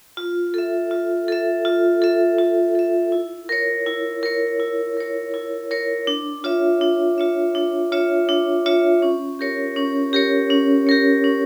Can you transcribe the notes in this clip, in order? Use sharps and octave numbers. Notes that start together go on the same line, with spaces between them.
F4
A4 E5
F4
A4 E5
F4
A4 E5
F4
A4 E5
E4
A#4 C#5
E4
A#4 C#5
E4
A#4 C#5
E4
A#4 C#5
D4
F4 C#5 E5
D4
F4 C#5 E5
D4
F4 C#5 E5
D4
F4 C#5 E5
C#4
G4 A#4 C#5
C#4
G4 A#4 C#5
C#4
G4 A#4 C#5
C#4